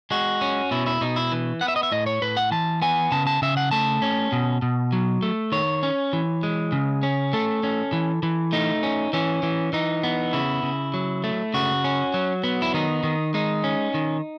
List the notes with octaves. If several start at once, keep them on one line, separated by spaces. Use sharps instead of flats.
G#3 F#4
C#4
B2 E4
E4
B2 D#4
E4
E3
B3 F#5
E5
D#5
E5
A2 D#5
C#5
A2 B4
F#5
E3 A5
B3 G#5
C#3 A5
A5
C#3 E5
F#5
A3 A5
C#4
B2
B2
F#3
A3
D#3 C#5
C#4
E3
G#3
C#3
C#4
A3 A4
C#4
E3
E3
A3 D#4
C#4
E3 C#4
E3
E3 D#4
B3
C#3 E4
C#3
F#3
A3
C#3 F#4
C#4
F#3
B3
E4
D#3 D#4
D#3
G#3 D#4
C#4
D#3